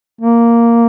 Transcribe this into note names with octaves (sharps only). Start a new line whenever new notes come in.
A#3